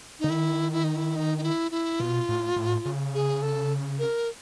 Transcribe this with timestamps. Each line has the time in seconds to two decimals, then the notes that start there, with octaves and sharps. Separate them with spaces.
0.20 D3 D#4
0.30 D#3 E4
0.72 E4
0.84 D#4
0.96 E4
1.16 D#4
1.38 D#4
1.43 E4
1.71 E4
2.00 B2 F4
2.29 A2
2.56 A2
2.85 C#3
3.14 G#4
3.42 A4
3.99 A#4